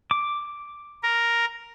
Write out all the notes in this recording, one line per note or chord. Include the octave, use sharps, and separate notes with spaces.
D6
A#4